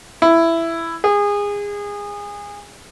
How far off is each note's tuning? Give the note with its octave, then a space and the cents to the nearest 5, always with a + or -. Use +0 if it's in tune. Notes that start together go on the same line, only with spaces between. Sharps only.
E4 +10
G#4 -25